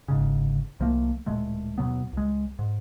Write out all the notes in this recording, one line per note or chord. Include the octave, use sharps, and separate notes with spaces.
G1 G#2 C#3
C2 F3 A3 A#3
D1 A#2 G#3 A3
D#2 B2 F#3 B3
C#2 G#3
G#2